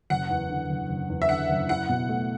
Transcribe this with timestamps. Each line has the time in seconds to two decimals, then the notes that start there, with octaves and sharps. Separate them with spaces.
0.10 F#1 F#5
0.30 E2
0.50 D3
0.70 F#1
0.89 F#1
1.09 E2
1.22 E5
1.29 D3 F#5
1.49 F#1
1.69 E4 F#5
1.89 B2
2.09 A3